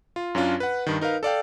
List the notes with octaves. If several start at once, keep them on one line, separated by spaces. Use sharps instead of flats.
F4
F#2 C#4 D4 F4
B4 F#5
G2 D#3
D#4 A#4 B4 F5
A4 D5 F5 G5